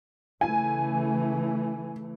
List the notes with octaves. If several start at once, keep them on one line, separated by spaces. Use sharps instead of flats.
C#3 E3 A3 G#5